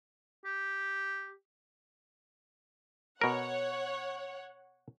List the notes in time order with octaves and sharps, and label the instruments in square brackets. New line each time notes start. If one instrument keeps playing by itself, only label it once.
[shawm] G4
[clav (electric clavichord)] B2 A#4 [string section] C#5 F#5